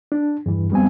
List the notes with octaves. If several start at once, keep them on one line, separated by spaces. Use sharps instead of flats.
D4
E2 G2 E3
F2 G3 B3 C4 G#5